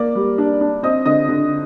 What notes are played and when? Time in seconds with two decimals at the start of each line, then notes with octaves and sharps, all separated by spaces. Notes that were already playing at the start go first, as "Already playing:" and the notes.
Already playing: A#3 D5 D6
0.15 G3
0.38 D4
0.61 D4
0.83 C4 D#5 D#6
1.06 D3 D#5 D#6
1.29 D3